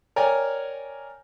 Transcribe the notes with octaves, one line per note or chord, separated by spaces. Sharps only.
A#4 C#5 D5 G5 G#5